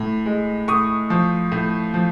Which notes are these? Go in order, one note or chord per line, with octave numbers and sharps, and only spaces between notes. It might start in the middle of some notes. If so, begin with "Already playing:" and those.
Already playing: A2
G#3
A2 C#6 D#6
F3
A2
F3